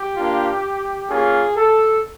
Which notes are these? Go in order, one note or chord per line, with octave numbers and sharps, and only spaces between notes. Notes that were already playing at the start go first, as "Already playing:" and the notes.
Already playing: G4
A#3 D4 F4
A#3 C#4 F4 G#4
A4